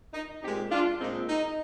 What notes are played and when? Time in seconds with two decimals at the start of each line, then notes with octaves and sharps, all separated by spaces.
0.13 D#4
0.41 A#2 G#3 C4 D#4 G4
0.71 D4 F4
0.99 A#2 G#3 C4 D#4
1.28 D#4